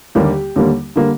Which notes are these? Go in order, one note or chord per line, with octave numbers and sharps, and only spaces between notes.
D#2 D3 G3 A#3 G4
D#2 D3 G3 A#3
D3 G3 A#3